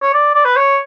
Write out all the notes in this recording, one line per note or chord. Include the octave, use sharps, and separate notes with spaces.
C#5
D5
D5
B4
C#5